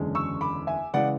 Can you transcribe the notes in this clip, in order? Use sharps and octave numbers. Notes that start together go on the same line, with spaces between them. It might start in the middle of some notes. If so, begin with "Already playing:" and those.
Already playing: F#1 E2 D3 G#3 C#4
C#6 E6
B5 D6
E5 G#5
C#3 E3 G#3 D5 F#5